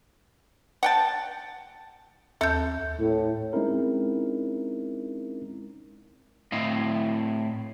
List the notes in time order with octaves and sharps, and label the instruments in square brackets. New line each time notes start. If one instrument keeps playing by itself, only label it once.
[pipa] F#5 G5 A5
[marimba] D#2 G6 [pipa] A4
[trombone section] A2
[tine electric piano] G#3 C4 C#4 D#4 E4 A#4
[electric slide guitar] A2 C4 E4 D#5 F5